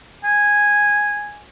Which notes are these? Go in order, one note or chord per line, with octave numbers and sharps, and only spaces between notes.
G#5